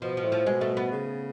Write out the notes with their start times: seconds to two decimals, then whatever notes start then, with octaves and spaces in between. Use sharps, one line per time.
0.02 B2 F3
0.17 F3
0.24 A2
0.32 F3
0.46 B2 G#3
0.61 A3
0.77 B3
0.92 C#3